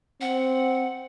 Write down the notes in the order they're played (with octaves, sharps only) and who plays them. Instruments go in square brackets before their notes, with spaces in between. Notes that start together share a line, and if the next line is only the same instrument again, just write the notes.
[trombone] C4 [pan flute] F#5